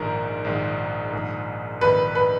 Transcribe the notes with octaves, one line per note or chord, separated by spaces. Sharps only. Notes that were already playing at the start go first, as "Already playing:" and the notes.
Already playing: A#1 G#2 D#3 A#4
A#1 G#2 D#3
A#1 G#2 D#3
A#1 G#2 D#3 B4
B4